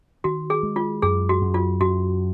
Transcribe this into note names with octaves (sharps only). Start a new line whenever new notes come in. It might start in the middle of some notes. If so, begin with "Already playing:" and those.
D#3 F#4
G#4
G#3
F4
F#2 G#4
F#4
F#2
F4
F#2 F#4